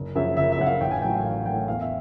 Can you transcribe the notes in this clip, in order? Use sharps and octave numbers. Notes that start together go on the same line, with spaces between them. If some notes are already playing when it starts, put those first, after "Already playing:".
Already playing: F#1
F#2 C#3 F3 E5
F#1 E5
E5
F#2 C#3 F3 F#5
F5
A1 G5
G#5
A2 F#3 G5
F5
A1 F5
A2 F#3 G5
E2 F5
E5